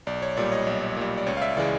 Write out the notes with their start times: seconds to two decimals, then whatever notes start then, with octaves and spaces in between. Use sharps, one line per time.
0.07 B1 D5
0.22 C#5
0.37 A#2 G3 D5
0.52 C#5 D#5
0.67 B1
0.96 A#2 G3
1.18 D5
1.26 C#2 C#5
1.37 F5
1.42 D5 E5
1.57 C#3 E3 G#3 D5